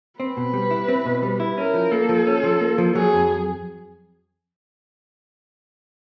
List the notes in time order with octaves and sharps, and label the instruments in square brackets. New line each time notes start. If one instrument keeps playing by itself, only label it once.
[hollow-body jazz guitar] C4 [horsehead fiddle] B4
[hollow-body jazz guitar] B2
G3
E4
C4
B2
G3
E4
[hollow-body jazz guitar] C#4 [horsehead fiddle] A#4
[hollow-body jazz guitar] F3
[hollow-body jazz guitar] A#3 [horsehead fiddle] A4
[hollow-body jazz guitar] F3
C#4
F3
A#3
F3
[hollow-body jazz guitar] F#3 [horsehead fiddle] G#4
[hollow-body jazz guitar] F2